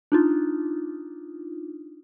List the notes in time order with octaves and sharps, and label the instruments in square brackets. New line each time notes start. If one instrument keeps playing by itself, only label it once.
[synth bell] D4 D#4 F4